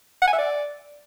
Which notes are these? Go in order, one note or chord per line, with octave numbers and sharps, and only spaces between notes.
F#5
G#5
E5
D5